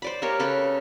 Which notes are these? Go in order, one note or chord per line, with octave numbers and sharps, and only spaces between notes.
C5 D5 B5
A#3 G4 A#4 C#5
C#3 A4 B4